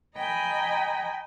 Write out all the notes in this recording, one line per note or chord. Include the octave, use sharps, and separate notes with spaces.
D#5 G5 G#5 A#5 B5